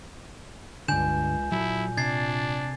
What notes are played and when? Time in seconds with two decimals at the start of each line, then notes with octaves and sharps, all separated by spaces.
0.88 C#2 G2 D3 G#5 G6 E7
1.52 A#2 F#3 E4 A4
1.98 C3 D4 G#6 A6 C7